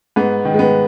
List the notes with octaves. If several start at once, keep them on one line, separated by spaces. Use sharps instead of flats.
G#2 B3
D#3
G#3
B3